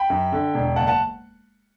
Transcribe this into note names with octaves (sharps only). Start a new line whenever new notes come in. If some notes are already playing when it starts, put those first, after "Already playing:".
Already playing: G5 B5
F#2
D3
E1
F#1 F#5 A5
F#5 A5